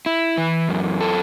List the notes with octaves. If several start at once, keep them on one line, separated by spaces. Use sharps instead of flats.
E4
E3
F#2
A4